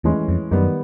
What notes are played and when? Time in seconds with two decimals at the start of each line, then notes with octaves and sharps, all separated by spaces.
0.04 E2 A2 E3 G#3 C#4
0.28 F2
0.51 F#2 D#3 G3 B3